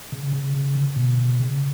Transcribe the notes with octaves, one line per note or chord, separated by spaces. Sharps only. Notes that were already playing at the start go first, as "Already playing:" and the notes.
C#3
C#3
C#3
D3
B2
B2
C#3